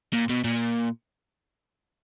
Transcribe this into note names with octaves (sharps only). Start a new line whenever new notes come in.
A#2
B2
A#2